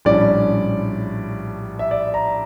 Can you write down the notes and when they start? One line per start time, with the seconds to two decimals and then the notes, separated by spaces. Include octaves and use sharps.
0.05 A#1 A2 G3 C#4 D5
1.79 E5
1.91 D5
2.14 A#5